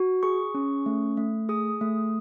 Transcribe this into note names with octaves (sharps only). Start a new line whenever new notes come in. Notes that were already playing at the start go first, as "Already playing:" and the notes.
Already playing: F#4
G#4 C#6
C#4
A3
A3
G#4 D#6
A3